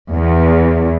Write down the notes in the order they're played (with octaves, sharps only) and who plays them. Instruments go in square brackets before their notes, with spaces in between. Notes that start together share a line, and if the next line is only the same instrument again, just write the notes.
[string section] E2